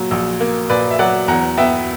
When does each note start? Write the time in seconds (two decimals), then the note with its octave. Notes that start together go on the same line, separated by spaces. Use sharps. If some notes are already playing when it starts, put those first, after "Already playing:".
Already playing: A#2 F#3
0.11 A#1
0.40 A#3
0.70 A#2 B4 D5
0.91 E5
0.99 F#3 D5 F#5
1.28 E2 F#5 A#5
1.57 B3 E5 G5